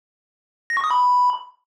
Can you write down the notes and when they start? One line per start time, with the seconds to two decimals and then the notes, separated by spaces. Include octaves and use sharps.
0.70 A#6
0.77 C#6
0.84 D#6
0.91 B5